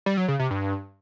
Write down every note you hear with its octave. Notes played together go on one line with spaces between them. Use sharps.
G3
F#3
C#3
C3
G2